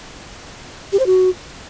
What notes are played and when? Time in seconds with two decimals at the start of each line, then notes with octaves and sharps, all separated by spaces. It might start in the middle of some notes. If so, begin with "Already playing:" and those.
0.92 G4
0.99 C5
1.06 F#4